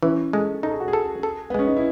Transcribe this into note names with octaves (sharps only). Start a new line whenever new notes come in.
E3 C#4
G#3 A4
D#4 A4
G#4
F#4
G#4
A4
A4
B3
G#3 C#4
D#4
E4